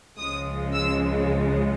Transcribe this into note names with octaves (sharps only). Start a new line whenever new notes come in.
C#2 C#3 F3 G#3 D#6
E6